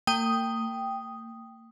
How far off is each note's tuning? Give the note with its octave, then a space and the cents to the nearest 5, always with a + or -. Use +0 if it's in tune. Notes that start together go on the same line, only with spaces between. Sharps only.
A#3 -40 G5 +0 D#6 +0